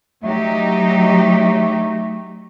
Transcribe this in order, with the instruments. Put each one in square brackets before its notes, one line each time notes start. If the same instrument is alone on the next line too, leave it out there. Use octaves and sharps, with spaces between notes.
[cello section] F#3 D#4 G4 [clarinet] A3